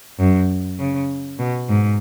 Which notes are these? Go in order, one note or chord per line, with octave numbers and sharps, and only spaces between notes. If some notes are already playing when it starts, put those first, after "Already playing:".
F#2
C#3
B2
G#2